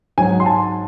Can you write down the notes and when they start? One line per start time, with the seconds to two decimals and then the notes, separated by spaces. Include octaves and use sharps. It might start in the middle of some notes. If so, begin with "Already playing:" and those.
0.18 G#2 F#3 G#5
0.40 C6
0.46 A5